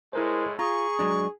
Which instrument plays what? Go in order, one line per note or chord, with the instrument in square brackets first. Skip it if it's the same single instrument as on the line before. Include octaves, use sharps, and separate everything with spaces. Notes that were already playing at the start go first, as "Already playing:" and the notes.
[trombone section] A2 G#3 [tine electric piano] E4 A#4 C5
[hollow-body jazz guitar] F4 [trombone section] G#4 [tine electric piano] A#5 [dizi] C#6
[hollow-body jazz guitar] F#3 G#3 D4